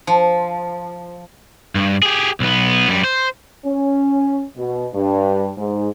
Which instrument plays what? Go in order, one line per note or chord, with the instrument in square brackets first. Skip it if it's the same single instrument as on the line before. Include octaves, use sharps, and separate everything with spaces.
[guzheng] F3
[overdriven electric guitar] G2
G4 G#4
B1 B3
F#2 G3
C5
[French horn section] C#4
B2
G2
G#2